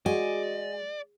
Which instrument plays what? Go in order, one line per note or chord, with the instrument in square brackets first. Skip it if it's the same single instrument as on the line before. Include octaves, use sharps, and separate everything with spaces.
[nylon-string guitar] G#3 [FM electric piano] F#4 [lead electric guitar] D5 [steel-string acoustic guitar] D#5 G#5